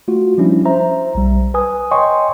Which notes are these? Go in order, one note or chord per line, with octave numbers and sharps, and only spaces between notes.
A3 F4 F#4
F3 G3 C#4 D4 E4
C5 E5 A#5
B1 G3
B4 G#5 D#6
C#5 D#5 G5 G#5 C6 C#6